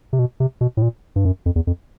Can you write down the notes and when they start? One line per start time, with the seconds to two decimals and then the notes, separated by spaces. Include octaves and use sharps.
0.13 C3
0.19 B2
0.40 C3
0.61 B2
0.77 A2
0.82 A#2
1.16 G2
1.25 F#2
1.46 F2
1.56 E2
1.67 F2